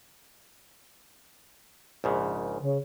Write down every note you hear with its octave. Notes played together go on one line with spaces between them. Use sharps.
A#1 G#2 C#3
C#3